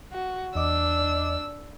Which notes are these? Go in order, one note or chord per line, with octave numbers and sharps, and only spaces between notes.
F#4
E2 D4 D#5 D6 E6